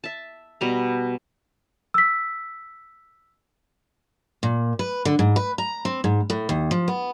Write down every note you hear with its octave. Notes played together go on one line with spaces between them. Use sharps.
E5 A5
B2 G3 A#5
E6 B6
A#2
B4
D3
G#2
B4
A#5
C4
G#2
A2
D#2
F3
B3